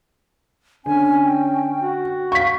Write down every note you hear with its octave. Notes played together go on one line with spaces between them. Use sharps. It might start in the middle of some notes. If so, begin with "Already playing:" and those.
D3 C#4 G#5
G5
F#4
F5 C#6 B6